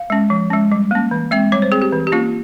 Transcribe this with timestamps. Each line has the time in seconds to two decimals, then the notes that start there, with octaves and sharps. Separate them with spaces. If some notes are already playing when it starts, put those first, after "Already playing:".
Already playing: F5
0.10 G#3 C#4
0.30 F3
0.50 G#3 C#4
0.72 G3
0.91 A#3 C#4
1.11 E3
1.31 G#3 C4 E5
1.52 G3 C#5
1.62 C5
1.72 C4 G#4
1.82 G4
1.92 E3
2.07 G4
2.12 A#3 C#4 F4